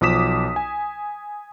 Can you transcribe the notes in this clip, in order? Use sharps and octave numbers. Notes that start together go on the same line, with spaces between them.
B1 F3 D6 D#6 B6 E7
G#5